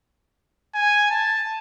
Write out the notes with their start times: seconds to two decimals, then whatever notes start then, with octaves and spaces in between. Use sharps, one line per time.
0.74 G#5
1.10 A5